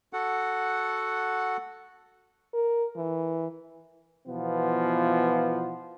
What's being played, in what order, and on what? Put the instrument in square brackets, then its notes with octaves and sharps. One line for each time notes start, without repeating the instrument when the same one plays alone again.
[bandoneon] F#4 A4 F#5
[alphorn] A#4
E3
[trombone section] B2 E3 F3 B3 F4